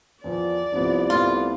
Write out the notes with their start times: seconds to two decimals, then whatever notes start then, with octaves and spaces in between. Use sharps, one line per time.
0.24 E2 F3 D5
0.73 C2 F3 B3
1.10 A3 B3 F4